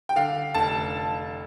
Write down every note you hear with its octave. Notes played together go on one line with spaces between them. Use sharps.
G5
D3 F5
F1 A5